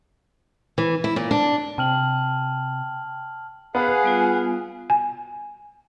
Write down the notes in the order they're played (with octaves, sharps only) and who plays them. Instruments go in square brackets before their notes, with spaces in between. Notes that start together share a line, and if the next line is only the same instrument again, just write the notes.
[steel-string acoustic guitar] E3
E4
A#2
D4
[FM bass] C3 [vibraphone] G5 [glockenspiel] A5 F6 F#7
[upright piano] B3 B5 [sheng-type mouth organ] G#4 F5 F#5
[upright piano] B4 [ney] G#5
[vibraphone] G3 B3 F4
[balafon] G#5